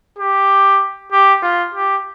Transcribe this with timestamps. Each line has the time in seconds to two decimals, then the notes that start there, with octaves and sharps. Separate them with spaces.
0.18 G4
1.12 G4
1.43 F4
1.74 G4